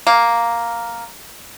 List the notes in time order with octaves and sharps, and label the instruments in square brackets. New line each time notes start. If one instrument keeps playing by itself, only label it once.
[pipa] A#3